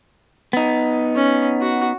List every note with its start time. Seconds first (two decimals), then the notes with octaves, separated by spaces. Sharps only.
0.53 B3 D#4
1.16 C#4
1.62 F#4